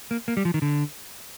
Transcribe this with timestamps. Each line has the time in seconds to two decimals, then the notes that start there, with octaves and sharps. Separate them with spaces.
0.11 A#3
0.28 A#3
0.37 G3
0.45 F3
0.54 D#3
0.62 D3